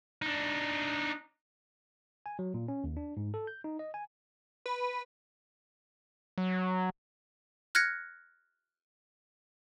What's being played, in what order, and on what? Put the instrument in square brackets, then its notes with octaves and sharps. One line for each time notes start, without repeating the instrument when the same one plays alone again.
[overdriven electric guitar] D4 D#4
[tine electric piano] G#5
F#3
A#2
C#4
D#2
D4
G#2
A4
G6
D#4
D#5
G#5
[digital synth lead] B4
[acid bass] F#3
[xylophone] F6 F#6 G#6 A#6 C#7